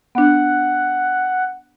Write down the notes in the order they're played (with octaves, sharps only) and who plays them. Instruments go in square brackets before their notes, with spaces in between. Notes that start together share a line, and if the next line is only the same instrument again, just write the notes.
[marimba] B3 D4 [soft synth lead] F#5